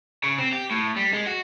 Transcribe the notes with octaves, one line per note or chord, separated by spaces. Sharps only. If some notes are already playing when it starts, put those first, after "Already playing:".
C#3
C4
G4
A2
G3
G#3
F#4